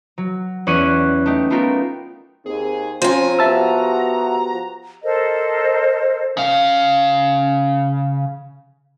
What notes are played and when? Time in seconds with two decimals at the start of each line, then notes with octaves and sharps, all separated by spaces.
0.18 F#3
0.67 E2 C#4 D5 C#6 F#6 D#7
1.26 A3 D#4 G4
1.50 A3 B3 F4 G4 A4 A#4
2.46 D#2 C4 G#4
3.02 F3 C4 C#4 C5 G#5 A#5
3.39 B3 F#4 G4 E5 A5 E6
5.03 A4 A#4 C5 D#5
6.37 C#3 F5